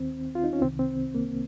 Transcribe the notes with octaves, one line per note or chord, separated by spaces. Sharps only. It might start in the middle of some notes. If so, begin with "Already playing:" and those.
Already playing: D#2 D#3 C4
F4
D#4
C#4
C2 C3 D#3 C4
C4
A#3